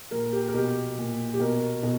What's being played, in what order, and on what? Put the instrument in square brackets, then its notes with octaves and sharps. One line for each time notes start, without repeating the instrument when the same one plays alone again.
[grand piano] A#2 A#4
G4
A#4
B2 G4
A#2
G4
B2 A#4
B2